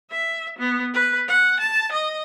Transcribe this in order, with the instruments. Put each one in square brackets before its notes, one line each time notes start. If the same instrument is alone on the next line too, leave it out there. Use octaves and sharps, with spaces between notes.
[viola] E5
B3
B4
F#5
A5
D#5